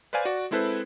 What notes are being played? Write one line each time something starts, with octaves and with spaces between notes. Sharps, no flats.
B4 C5 D5 F5 G#5
F#4 D5
G#3 C4 E4 A4 B4 C5